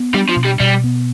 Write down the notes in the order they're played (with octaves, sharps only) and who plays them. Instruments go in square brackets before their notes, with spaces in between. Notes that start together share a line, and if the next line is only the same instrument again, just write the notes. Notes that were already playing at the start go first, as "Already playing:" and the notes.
Already playing: [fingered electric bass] B3
[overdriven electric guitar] G3 [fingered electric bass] D4
[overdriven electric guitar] F3
[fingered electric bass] B2
[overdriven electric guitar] G3
[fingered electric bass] B2 [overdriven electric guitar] G3
[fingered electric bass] B3